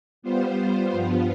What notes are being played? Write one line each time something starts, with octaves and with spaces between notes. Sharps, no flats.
G3 B3 F4 C5
G2 F3 B3 F4